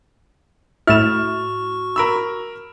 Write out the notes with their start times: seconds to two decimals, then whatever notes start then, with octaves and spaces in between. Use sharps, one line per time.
0.87 A2 E4 F#4 C#6 F6 A6 E7
1.96 A#4 B5 E6